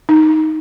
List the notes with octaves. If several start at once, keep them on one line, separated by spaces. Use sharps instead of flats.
D#4